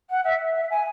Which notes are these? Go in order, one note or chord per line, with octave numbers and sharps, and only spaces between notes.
F#5
E5
E5
G#5